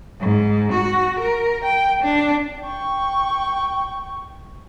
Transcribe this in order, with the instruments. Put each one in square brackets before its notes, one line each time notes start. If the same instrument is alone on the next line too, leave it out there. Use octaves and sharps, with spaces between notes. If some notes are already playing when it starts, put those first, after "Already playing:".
[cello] G#2
F#4
A#4
G5
D4
[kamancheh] G5 C#6